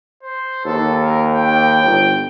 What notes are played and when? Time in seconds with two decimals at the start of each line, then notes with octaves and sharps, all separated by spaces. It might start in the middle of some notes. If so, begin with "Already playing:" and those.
0.23 C5
0.65 D#2 A4
1.02 A#4
1.32 G5
1.84 G1